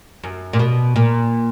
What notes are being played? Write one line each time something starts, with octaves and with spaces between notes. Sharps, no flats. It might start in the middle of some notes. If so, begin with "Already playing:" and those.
F#2
A#2
B2
A#2